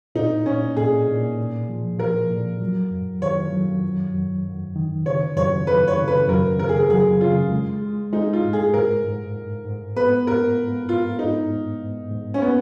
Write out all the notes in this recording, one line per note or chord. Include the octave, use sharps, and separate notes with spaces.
A#2 D#4
A#2 C#4
A#2 G#4
A#2
A#2
F3
F3 A#4
A#2
F#3
F#2
D#3 C#5
F#3
F#2
F#2
F#2
D#3
C#3 C#5
F#2 C#5
F#2 B4
C#5
C#3
B4
F#2 A#4
C#3 A#4
G#4
A#4
F#3 G#4
C#3 F4
G#3
G#3
G#3 D#4
F4
G#2
G#4
G#2 A#4
G#2
G#2
G#2
B3 B4
G#2 A#4
G#2
G#2 F4
G#2 D#4
G#2
G#2
G#2
C#4
A#3 B3